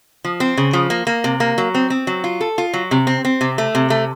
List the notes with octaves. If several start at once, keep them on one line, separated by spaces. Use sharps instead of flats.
F3
C4
C#3
F3
A#3
A#3
C3
A#3
F#3
C4
C4
F#3
F4
A4
F4
F#3
C3
C4
C4
C3
A3
C3
A3